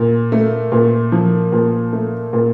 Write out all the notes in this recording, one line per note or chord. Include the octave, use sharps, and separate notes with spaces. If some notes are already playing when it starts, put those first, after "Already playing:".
Already playing: A#2
A3
A#2
F3
A#2
A3
A#2